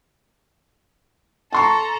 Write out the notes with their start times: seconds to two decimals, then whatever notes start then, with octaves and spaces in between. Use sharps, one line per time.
1.53 A4 A5 A#5 C6 C#6